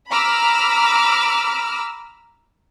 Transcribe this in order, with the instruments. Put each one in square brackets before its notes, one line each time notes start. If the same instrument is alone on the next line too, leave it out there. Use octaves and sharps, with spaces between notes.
[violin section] A#5 B5 D6 E6 F6